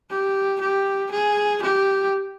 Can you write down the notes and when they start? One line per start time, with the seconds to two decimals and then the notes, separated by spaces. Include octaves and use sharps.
0.10 G4
0.61 G4
1.11 G#4
1.62 G4